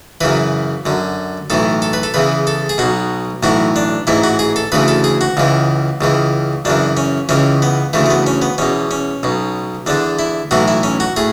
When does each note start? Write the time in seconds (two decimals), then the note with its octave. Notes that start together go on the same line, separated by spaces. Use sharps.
0.21 F#2 C#3 E3 B4
0.86 F#2 D3
1.50 B1 A2 E3 A4
1.82 A4
1.93 B4
2.03 A4
2.14 E2 C#3 E3 B4
2.47 A4
2.69 G#4
2.78 B1 B2 F#4
3.43 B1 A2 E3 F#4
3.76 D4
4.07 A1 G#2 E3 E4
4.23 F#4
4.39 G#4
4.56 A4
4.72 D2 C#3 E3 B4
4.88 A4
5.04 G#4
5.21 F#4
5.37 C#2 C#3 E3
6.01 C#2 C#3 E3
6.65 F#2 C#3 E3 D4
6.97 C#4
7.29 C#2 C#3 E3 C#4
7.62 B3
7.93 D2 C#3 E3 A3
8.06 A3
8.10 B3
8.27 C#4
8.42 B3
8.58 E2 B2 C#4
8.91 C#4
9.23 B1 B2
9.87 E2 D3 D4
10.19 E4
10.51 B1 A2 E3 F#4
10.68 E4
10.83 C#4
11.00 F#4
11.17 A2 G#4